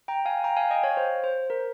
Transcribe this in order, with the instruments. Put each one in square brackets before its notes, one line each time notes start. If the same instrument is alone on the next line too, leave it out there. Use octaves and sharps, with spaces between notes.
[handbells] G5 A#5
F5 G#5
G5 A#5
F5 G#5
D#5 G5
C#5 F5
C5
C5
A#4